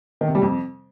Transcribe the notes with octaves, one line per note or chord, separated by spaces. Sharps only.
D#3
C3
G3
F2